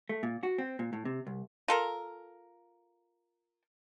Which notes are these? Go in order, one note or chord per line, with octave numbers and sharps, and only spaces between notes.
A3
A#2
F#4
C4
A#2
A2
C3
C2
F4 A4 A#4